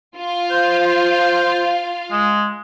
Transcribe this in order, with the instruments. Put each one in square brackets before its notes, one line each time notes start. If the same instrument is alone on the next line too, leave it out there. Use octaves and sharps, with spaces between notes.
[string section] F4 F5
[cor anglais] C5
G#3